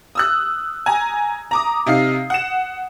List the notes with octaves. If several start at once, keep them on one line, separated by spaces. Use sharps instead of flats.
D#6 E6 F#6
G#5 A#5
A#5 D6 D#6
C3 D#4 F5 C7
F#5 E7